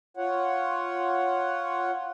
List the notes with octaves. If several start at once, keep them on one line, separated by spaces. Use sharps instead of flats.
F4 C#5 F#5